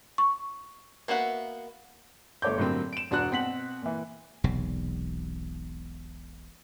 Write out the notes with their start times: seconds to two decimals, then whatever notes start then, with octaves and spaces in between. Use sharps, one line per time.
0.18 C#6
1.08 A#3 B3 F#4 E5 F#5
2.42 G1 A3 C#5 D6 G6
2.58 A2 D3 F#3 G3 A#3 C4
2.93 D7 E7
3.11 E1 D4 F#4 F#6
3.31 B2 C4 F#5 B6 F#7
3.82 A#2 E3
4.44 E1 B1 C3